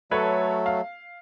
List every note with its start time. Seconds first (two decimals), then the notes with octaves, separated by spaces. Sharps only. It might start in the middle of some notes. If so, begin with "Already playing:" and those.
0.11 F#3 A3 A4 B4 C#5
0.66 F5